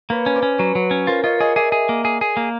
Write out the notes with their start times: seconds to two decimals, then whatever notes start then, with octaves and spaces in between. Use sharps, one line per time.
0.10 A#3 B4 C#5
0.26 C#4
0.35 C5 D5
0.43 C#4
0.59 F#3 B4 C#5
0.75 F#3
0.91 C#4
1.07 F4 A#4 C5
1.24 F4 C#5 D#5
1.40 G#4 C#5 D#5
1.56 G#4 D5 E5
1.72 G#4
1.89 A#3
2.05 G#4
2.21 G#4
2.37 A#3